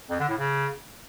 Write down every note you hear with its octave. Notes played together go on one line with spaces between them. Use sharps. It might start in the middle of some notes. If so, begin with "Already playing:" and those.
F2
D3
A2
C#3